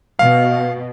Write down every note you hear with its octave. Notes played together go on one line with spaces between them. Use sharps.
B2 F5